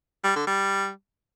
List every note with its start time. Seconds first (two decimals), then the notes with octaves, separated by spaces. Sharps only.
0.24 G3
0.36 D3
0.47 G3